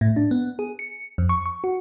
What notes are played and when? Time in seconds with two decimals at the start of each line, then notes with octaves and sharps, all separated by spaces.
0.01 A2
0.16 D4
0.31 B3
0.59 G#4
0.79 C#7
1.18 F2
1.29 C#6
1.46 C#6
1.64 F#4